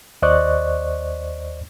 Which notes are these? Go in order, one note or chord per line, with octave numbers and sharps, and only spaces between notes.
D#2 C5 D5 D#5 C#6 F#6